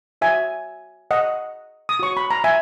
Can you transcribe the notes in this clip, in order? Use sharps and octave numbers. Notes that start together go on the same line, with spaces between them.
F#4 C#5 E5 G#5
D#5 F#5
D#6
F#4 C#5 C#6
B5
A#5
E5 G#5